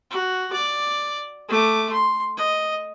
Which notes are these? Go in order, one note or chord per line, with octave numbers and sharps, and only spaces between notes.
F#4
D5
A3 D6
C6
D#5